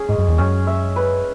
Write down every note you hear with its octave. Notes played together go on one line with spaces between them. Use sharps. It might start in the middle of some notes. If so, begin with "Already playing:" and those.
Already playing: C#4 G#4
G#2 G#3
F#2
E2
F#2 C#4
E5
B4